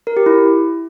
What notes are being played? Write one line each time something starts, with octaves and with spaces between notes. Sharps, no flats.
A#4
G4
E4